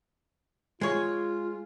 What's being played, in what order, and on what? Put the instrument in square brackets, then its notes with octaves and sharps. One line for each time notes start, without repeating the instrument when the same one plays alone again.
[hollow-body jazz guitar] G#3 C#5 [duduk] F4